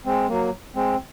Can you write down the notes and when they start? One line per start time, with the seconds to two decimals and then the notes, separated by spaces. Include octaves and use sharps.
0.05 G#3 C4
0.28 F#3 A#3
0.75 G#3 C4